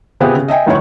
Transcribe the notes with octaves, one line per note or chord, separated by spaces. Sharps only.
C3 B3 C4 F4 G4 G#4
C#3
D#5 E5 G5 G#5
F1 D2 D#3 E4 C#5 C#6